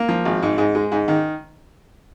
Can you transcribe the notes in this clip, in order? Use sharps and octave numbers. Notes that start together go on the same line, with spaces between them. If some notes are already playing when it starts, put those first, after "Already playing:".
Already playing: A#3
F3
G#1
G#2
G#2
G#3
G#2
D#3